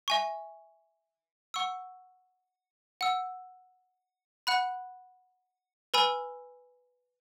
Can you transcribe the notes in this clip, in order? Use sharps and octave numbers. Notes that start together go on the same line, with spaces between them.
E5 G#5 C#6
F#5 C#6 E6
F#5 E6
F#5 B5 F#6
B4 G#5 B5 E6